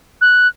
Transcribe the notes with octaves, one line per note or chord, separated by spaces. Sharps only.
F#6